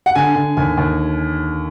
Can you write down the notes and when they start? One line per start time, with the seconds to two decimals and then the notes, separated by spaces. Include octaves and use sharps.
0.06 F#5
0.15 D3 G#5
0.35 D3
0.57 D#2 G#5
0.77 D#2